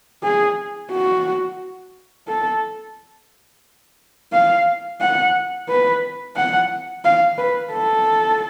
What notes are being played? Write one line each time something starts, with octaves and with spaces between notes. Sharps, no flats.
G#4
F#4
A4
F5
F#5
B4
F#5
F5
B4
A4